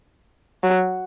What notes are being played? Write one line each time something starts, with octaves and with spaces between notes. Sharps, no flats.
F#3